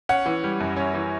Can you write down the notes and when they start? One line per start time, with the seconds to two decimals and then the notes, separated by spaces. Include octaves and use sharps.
0.09 C#4 F#5
0.26 E3
0.44 G3
0.60 F#2
0.77 C#4
0.94 E3